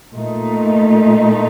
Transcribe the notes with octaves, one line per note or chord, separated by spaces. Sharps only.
A#2 A3 D#4